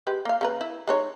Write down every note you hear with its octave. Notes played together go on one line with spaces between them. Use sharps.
G#3 G4 B4
A#3 F5
C#3 A#3 B4
E4
G#3 D#4 C#5